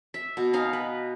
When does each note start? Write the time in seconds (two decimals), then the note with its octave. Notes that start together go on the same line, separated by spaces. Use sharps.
0.14 E5
0.37 B2
0.53 D#4 F5 G#5
0.73 B4